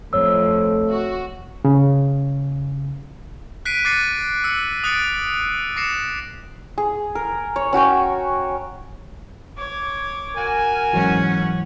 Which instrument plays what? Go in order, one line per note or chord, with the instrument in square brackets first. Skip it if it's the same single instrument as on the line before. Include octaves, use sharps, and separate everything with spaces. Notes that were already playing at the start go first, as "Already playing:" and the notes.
[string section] F2 [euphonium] A3 [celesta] C#5 E6
[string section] F#4
[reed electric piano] C#3
[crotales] F#6 B6 C7 D7 D#7
D6 F#6 A6 C7 C#7 D#7
E6 C#7
D#6 F#6 A6 C#7 D7
D6 A#6 C7 C#7 E7
[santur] G#4
A#4
C#5
C#4 F#4 G5 G#5
[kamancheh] C#5 D6
[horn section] F#4 A#4 G#5
[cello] G#2 C#4 [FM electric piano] E3 F#3 [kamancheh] C#5 F#5